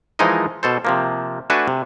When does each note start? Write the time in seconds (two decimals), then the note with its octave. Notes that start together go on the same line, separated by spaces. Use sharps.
0.19 E3 F3 G#3 D#4 A#4 D#5
0.63 B2 A4 C5
0.85 C3 F3 A#3
1.50 A3 D4 F#4 B4 G#5 A5
1.68 C3